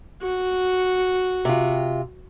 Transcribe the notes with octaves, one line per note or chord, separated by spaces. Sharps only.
F#4
C3 F4